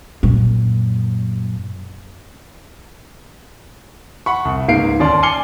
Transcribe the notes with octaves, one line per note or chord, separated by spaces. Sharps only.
F#2 A#2
F#5 B5 C#6
C2
C#2 G#2 A#3 F5 C7 D7
D#2 C#4 D5 A5 C6
G#5 D6 F6 C7 C#7 G7